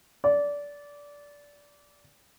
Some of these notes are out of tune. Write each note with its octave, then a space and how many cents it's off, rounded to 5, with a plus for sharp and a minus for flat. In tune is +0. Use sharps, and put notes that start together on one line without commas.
D5 -20